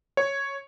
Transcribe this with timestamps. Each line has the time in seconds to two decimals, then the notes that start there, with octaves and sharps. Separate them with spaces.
0.17 C#5